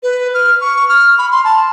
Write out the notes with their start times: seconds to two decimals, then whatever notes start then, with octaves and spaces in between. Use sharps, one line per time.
0.03 B4
0.34 F6
0.61 C#6
0.89 F6
1.18 B5
1.31 C6
1.44 A5